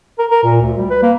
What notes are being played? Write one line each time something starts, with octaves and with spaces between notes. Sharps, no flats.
A#4
A#4
A#2
D2
G3
B4
A#3